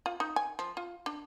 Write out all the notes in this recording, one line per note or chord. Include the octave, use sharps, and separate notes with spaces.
F4
D#4
G#5
F3
F4
D4